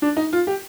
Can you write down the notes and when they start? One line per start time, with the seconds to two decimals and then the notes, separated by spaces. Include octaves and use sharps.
0.02 D4
0.17 D#4
0.33 F4
0.47 G4